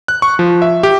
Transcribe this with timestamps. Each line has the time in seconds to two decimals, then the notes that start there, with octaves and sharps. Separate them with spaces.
0.08 F#6
0.22 C#6
0.39 F3
0.62 E5
0.83 G4